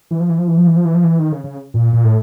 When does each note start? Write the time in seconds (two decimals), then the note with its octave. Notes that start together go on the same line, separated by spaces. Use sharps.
0.11 E3
0.20 F3
0.29 E3
0.38 F3
0.48 E3
0.57 F3
0.67 E3
0.76 F3
0.85 E3
0.94 F3
1.04 E3
1.19 D#3
1.32 C#3
1.44 C#3
1.74 A#2
1.93 A#2
2.04 A2